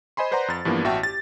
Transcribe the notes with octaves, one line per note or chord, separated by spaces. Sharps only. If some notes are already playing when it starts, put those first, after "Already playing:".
C5 D#5 G#5 B5 C6
B4 C5 D5 F#5 A#5 C6
F2 A6
G2 E3 F3 A#3 B3
A1 F#4 E5 G5 A5
G4 A6